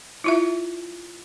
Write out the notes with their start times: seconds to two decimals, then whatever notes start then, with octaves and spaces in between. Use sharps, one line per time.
0.24 E4 F4 E5